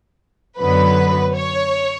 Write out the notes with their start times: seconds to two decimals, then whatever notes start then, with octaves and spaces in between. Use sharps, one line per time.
0.58 F#2 D3 F#3 B3 B4
1.34 C#5